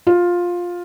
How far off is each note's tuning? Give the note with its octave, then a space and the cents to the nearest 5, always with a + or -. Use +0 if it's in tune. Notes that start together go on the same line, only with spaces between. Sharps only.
F4 +10